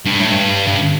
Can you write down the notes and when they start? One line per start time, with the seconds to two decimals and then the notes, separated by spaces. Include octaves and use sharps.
0.05 G2
0.19 A2
0.32 G2
0.67 G2